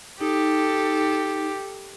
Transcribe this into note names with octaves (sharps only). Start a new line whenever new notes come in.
D#4 G4 A4